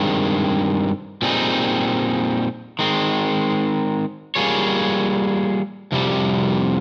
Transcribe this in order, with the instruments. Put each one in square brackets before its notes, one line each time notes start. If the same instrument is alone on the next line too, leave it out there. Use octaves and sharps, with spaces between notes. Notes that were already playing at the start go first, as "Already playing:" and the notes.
Already playing: [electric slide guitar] G2 D#3 G#3 C4
A#2 G3 C4 D#4 G#4
D#3 G#3 C4
G3 A#3 F4 G#4 C#5
F2 C3 G3